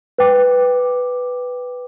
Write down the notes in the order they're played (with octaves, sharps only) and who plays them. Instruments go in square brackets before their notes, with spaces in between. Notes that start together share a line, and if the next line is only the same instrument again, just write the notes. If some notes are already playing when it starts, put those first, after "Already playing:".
[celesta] B4 G5 D6